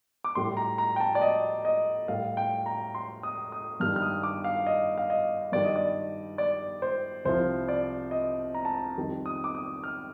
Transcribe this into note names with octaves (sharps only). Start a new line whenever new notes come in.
D6
A2 G3 C6
A#5
A#5
G5
A5
D5
D#5
D#5
A2 G3 F5
G5
A#5
C6
D#6
D#6
G2 D#3 G3 F6
F6
D#6
D6
F5
D#5
F5
D#5
G2 D#3 G3 D5
D#5
D5
D5
C5
C2 C3 F3 C5
D5
D#5
A#5
A5
A#5
F2 D#3 G3
D#6
D6
D#6
F6